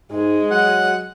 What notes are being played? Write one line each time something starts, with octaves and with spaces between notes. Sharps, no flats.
G#2 G#3 D#5
F#3 F#5